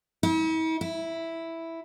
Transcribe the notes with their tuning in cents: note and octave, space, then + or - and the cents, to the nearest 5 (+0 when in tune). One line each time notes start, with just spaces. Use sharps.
E4 -45
E4 +0